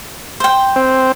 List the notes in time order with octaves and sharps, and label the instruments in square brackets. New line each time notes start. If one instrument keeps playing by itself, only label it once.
[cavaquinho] C5 G5
[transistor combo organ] C4